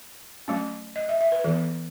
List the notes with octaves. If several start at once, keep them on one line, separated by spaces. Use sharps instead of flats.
F#3 A3 C#4
D#5
E5
E5
B4
E3 B3 A4